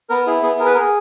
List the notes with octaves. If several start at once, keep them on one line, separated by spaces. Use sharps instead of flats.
B3 A#4
E4 G#4
B3 G#4
G#4 A#4
B4
G#4 A#4